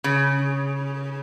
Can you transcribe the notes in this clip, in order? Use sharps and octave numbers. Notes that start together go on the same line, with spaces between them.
C#3